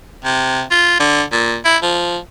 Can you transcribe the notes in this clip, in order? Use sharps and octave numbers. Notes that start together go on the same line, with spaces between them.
C3
F4
D3
A#2
E4
F3